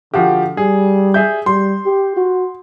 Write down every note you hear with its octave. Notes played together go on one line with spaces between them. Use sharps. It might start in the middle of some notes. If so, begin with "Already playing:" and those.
D3 F3 F#4 G4
G3 G#4
G#4 E5 G6
G3 C6
G4
F#4